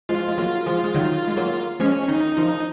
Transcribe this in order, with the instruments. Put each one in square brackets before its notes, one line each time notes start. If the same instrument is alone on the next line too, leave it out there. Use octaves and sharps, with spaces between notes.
[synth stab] F3 G#3 [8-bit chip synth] F4
[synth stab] G#3
F#3 A#3
F3 G#3
G#3
D#3 F#3
G#3
F#3 A#3
[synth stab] F3 G#3 [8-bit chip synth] C#4
[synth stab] D#3 [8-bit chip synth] D#4
[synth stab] F3 [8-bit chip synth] D#4